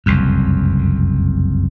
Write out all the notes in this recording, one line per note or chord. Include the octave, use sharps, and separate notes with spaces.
F#1 C2 F2